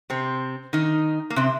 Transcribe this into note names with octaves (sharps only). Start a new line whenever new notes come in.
C3 C4
D#3 D#4
A#3
C3 C4